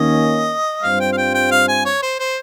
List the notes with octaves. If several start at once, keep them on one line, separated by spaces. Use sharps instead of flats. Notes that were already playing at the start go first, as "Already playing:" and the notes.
Already playing: D#2 D#3 A#3 C#4 D#5
G2 G3 C4 F4 C5 F5
G5
F5
G5
G5
F5
G#5
C#5
C5
C5